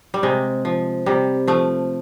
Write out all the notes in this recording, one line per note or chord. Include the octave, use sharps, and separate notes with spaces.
G3
C3 G#3
F3
C3 G3
F3 A3